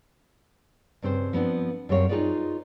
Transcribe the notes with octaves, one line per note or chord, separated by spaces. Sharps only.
G2 C#3 C4 G#4 C5
F3 B3 C4 D4
F#2 G3 C4 A#4 C#5 F5
D#4 F4 G#4 B4 D5